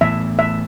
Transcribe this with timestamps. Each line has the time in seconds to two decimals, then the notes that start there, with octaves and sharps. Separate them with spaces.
0.01 A2 E3 B3 E5
0.39 E5